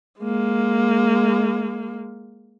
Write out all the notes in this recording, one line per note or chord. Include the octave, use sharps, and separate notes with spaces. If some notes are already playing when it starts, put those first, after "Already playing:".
G#3 A#3